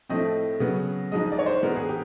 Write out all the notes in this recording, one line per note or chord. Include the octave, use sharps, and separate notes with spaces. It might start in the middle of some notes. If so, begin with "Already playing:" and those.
A2 F3 A3 C4 D#5
C#3 F#3 B3
G#2 F3 G#3 D#5
D#5
D5
C#5
C5
A2 E3 G#3 B3 A#4
G#4
G4